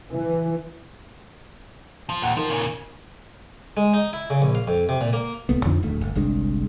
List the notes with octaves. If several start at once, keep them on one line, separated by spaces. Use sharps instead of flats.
E3
F3
D#2 A#2 F#5
D#3 F3 A#4
A#2 C#3
G#3
D#4
E4
C#3
A#1
F5
F2
C3
A#2
A#3
D1 C2 A3 B3
F2 D3 D#3 F3
D1 D2 A3
G1
G1 C2 G#3 D4